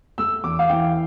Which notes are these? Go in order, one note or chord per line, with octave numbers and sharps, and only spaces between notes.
A3 E6
E2 D6
F5
E3 G5